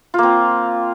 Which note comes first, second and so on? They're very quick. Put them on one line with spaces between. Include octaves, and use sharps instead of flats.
F4 A#3 C4